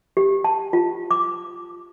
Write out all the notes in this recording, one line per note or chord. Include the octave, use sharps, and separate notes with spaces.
G4
A5
F4
D6